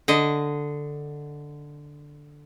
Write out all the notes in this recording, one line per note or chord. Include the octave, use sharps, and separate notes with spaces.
D3 D#5